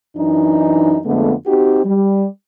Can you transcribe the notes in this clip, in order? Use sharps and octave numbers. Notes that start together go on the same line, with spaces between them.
F#2 E3 D4 D#4
F2 D3 G#3 A3 B3
C4 D#4 F#4 G4
G3